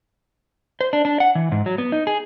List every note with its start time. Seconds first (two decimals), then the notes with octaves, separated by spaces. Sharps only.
0.81 C5
0.93 D4
1.05 D4
1.20 F#5
1.35 E3
1.52 G#2
1.66 F#3
1.78 B3
1.92 D#4
2.07 G#4